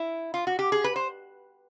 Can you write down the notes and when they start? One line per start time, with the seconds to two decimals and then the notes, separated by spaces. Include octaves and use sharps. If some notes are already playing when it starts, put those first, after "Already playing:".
Already playing: E4
0.34 F4
0.47 F#4
0.59 G4
0.72 G#4
0.84 B4
0.96 C5